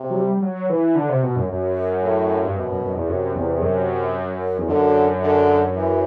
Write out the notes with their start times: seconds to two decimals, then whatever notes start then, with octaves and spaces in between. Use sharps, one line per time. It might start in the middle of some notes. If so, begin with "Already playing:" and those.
Already playing: C3
0.10 F#3
0.17 G3
0.37 G3
0.42 F#3
0.69 E3
0.95 D3
1.09 C3
1.23 B2
1.36 F#2
1.49 F#2
2.02 A2
2.44 G2
2.55 F#2 B2
2.68 F#2
2.82 F#2
2.95 E2
3.08 F#2 C3
3.35 E2
3.62 F#2
4.58 E2
4.68 F#2 D3
5.22 D3
5.75 E3